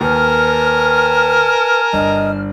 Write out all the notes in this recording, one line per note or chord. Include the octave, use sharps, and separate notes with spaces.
D#2 A#4 B4 G#5 A5 F6
G1 D#5